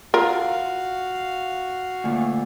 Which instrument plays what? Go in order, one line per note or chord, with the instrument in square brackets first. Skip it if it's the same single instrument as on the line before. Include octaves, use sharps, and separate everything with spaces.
[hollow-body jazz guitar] F4 [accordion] F#4 F5 [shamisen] A#4
[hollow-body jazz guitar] D2 A#2 [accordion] A3